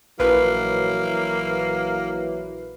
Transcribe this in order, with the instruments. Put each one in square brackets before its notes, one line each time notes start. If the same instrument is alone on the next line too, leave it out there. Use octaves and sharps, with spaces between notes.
[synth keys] A#1 B4 [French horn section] E3 F#3 E4 [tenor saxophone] A#3